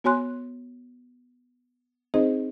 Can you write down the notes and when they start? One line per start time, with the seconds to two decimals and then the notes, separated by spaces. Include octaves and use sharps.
0.04 B3 F#4 C#5 G#5 C6 F#6
2.14 C4 D#4 G#4 C5 D#5